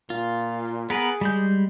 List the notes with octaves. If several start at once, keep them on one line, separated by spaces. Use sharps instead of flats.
A#2 F4
B3 G#4 A#4 B4
G3 G#3 G6